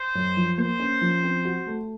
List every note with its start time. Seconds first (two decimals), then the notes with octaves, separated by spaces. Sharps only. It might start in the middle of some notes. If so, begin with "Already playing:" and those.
Already playing: C5
0.15 F#2
0.37 F3
0.58 A#3 C5
0.80 C#4
1.01 F3
1.23 C4
1.45 F#4
1.67 A3